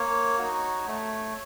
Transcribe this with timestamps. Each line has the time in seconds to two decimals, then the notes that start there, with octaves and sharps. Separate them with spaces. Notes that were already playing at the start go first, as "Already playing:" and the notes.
Already playing: A#3 C#5
0.38 D#4 F#4
0.86 A3